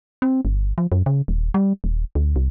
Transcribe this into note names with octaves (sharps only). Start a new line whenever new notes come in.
C4
G1
F3
F#2
C#3
D#1
G3
D#1
D2
C2